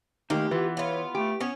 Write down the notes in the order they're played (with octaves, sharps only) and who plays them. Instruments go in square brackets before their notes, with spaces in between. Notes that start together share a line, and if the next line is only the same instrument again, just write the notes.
[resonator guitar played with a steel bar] D#3 A#3 [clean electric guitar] A3 D#4 [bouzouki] G4
[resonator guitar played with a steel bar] E3 [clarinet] F4 [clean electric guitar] B4 F#5
[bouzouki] B3 F4 [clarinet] C#5
[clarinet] A3 [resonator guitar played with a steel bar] G4
[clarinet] B3 [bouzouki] C#4 C#5